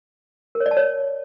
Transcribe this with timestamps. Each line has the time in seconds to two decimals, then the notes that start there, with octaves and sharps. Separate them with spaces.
0.55 A#4
0.60 C#5
0.66 D5
0.71 A5
0.77 C#5